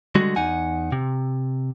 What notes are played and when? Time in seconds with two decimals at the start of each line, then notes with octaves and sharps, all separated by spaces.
0.15 D3 G3 G#3 F#4
0.36 E2 D#4 F#5 G#5
0.92 C3